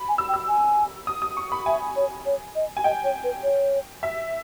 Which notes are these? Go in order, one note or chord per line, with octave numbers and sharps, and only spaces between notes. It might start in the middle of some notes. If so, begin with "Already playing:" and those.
Already playing: B5
G#5
E6
G5
E6
G#5
D#6
D#6
C#6
B5
E5 G#5
C#5
C#5
D#5
G#5
D#5 G5
C#5
B4
C#5
E5